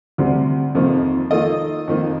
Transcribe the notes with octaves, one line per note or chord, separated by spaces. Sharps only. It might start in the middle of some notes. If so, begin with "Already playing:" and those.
D2 C3 G3
F2 C3 D#3 A#3
D#3 A#3 F4 A4 D#5
F2 D#3 A#3